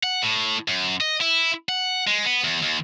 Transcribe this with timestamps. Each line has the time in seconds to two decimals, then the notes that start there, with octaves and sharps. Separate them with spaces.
0.03 F#5
0.22 A2
0.68 F#2
1.01 D#5
1.21 E4
1.69 F#5
2.07 G#3
2.25 B3
2.44 E2
2.62 D#2